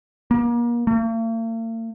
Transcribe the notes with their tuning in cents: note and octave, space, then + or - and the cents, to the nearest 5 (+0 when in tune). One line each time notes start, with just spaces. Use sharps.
A#3 +35
A#3 -45